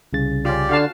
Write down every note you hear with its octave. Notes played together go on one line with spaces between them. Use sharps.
C2 C#3 A6
C#4 F4 G4 D5
D3 F#4 F5 A5